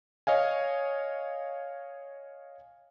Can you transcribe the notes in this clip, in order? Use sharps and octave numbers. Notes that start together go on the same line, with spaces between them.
C#5 D#5 F5 G#5